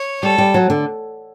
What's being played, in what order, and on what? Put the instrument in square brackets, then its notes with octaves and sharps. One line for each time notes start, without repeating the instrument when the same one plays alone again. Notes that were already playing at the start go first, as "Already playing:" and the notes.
Already playing: [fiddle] C#5
[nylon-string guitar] G3 [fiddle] A4
[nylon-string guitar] G3
F#3
D3